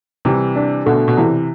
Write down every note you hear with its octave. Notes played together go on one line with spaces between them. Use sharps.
C3 E3 G3
D4
B2 D3 A3
B2
C3 E3